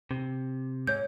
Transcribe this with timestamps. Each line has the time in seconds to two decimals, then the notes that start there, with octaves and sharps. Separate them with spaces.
0.11 C3
0.87 G#2 C#5 G6